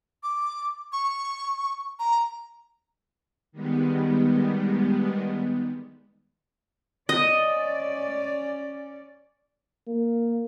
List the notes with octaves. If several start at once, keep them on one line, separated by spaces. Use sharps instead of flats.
D6
C#6
A#5
D#3 G3 G#3 B3
C#4 D5 D#5
A#3